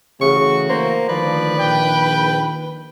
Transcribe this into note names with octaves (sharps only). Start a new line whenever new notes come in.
C#3 E3 A3 F#4 C#6
A#3 C5
D2 D#3 F3 B4 D5
A#1 G5